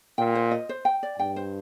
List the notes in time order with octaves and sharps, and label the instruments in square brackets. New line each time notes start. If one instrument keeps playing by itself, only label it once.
[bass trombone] A#2 [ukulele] G5
[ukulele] C5
D#5
C5
G5
D5
[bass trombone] G2 [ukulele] G5
[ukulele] C5